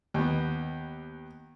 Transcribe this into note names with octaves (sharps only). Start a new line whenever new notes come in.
D#2 B3